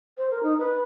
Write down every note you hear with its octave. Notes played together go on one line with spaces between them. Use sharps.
C5
A#4
D#4
B4